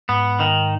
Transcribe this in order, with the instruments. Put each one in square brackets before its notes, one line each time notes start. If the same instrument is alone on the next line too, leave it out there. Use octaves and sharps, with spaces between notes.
[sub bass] G#2 [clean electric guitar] B3
[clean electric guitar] D#3